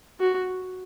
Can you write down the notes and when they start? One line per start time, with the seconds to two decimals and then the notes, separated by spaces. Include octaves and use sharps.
0.20 F#4